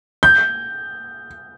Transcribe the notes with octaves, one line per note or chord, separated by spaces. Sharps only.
G6